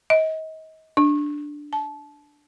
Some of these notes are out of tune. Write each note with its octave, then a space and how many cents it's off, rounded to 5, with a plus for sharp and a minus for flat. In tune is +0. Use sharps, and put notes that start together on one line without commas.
D#5 +30
D4 +5
A5 -25